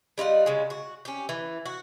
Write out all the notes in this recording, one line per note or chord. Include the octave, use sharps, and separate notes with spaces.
G3 D#4 F4 F#5
C#3 G#3
F#4
C#4 G4
E3
F#4